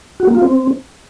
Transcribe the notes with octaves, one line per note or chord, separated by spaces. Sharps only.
F#4
A#3
F4
C4